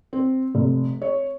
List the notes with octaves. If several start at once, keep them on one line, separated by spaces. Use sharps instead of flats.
C4
F1
C#5